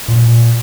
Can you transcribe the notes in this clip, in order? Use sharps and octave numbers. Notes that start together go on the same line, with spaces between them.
A#2